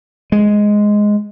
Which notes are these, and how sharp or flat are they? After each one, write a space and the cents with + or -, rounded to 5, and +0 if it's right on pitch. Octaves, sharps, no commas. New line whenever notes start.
G#3 +0